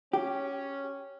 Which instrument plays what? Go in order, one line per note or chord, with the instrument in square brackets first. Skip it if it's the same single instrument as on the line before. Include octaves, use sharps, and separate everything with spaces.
[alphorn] C#4 [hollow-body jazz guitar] G4